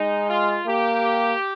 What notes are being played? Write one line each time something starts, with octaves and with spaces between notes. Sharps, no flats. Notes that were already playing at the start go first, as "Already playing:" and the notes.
Already playing: G#3 D#4
F4
A#3 G4